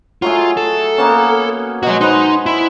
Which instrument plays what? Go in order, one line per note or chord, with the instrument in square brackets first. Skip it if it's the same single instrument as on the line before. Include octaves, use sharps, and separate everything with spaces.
[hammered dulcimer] F#3 A3 G#4 [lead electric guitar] F4
[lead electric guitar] A4
[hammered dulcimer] A#3 B3 C#4
[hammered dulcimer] B2 G#3 [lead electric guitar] F#4 C#5
[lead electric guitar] D#4 [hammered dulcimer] C5 F#5 B5
[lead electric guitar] E4